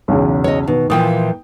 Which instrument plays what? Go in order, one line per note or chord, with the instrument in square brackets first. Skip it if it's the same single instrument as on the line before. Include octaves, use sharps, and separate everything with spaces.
[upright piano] B1 E2 C#3
[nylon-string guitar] C#5 D#5
[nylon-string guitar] B2 [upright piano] D#3
[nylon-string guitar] A#2 E3 F3 [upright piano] G5 D#6